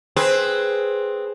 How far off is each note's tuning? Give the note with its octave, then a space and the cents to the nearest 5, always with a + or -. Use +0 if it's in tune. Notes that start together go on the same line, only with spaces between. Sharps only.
C4 +5 G#4 +0 B4 +0